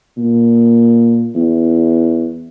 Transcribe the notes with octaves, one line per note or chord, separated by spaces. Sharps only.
A#2
E2